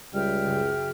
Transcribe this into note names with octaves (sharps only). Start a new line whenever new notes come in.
C#2 G3 E5 G5 F6
F#1